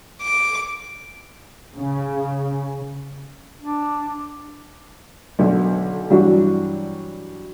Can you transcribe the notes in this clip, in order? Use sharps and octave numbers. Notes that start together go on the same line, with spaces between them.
D6
C#3
D4
B1 D3
G2 E3 F#3 D4 F#4